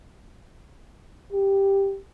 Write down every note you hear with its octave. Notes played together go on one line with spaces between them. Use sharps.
G4